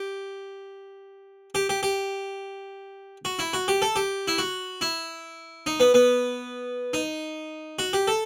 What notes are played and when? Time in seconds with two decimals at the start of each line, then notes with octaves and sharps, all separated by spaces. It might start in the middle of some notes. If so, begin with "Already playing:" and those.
Already playing: G4
1.55 G4
1.69 G4
1.83 G4
3.25 F#4
3.39 E4
3.53 F#4
3.68 G4
3.82 A4
3.96 G4
4.28 E4
4.38 F#4
4.81 E4
5.66 D#4
5.80 B3
5.94 B3
6.93 D#4
7.79 F#4
7.93 G4
8.07 A4